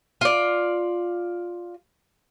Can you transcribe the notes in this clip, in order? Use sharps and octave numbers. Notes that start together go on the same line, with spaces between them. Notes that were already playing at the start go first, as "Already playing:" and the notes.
F4 D5